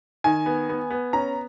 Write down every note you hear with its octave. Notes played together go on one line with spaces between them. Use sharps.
D#3 G#5
B3
B3
B3
C#4 A#5